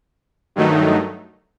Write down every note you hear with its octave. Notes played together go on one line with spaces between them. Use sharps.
G2 D#3 F#3 A3 D#4